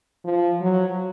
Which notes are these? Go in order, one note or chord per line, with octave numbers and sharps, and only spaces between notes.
F3
F#3